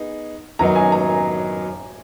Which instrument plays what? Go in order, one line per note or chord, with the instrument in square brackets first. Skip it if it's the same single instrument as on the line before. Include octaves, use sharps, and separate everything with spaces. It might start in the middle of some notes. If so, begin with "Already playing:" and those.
Already playing: [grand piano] B3 D#4 G#4
[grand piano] F#2 D#3 F#3 B3 D#4 [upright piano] A#5
[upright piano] G#5
A#5
G#5